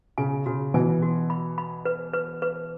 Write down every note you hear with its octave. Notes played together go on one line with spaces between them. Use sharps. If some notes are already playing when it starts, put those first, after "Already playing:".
C#3 G#5
C#3 F#4
B2 E3 G#5
F#4
B5
B5
B4
B4
B4